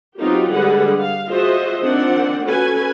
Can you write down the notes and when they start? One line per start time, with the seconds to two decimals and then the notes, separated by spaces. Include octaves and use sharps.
0.19 F#3 B3 C4 D#4 F4 G4
0.51 D3 G3 G#3 G#4 B4 F#5
0.98 F5
1.27 F4 F#4 G#4 C5 D#5 E5
1.83 D#3 F3 C4 D4 F#5
2.44 C#4 F#4 A4 B4 G#5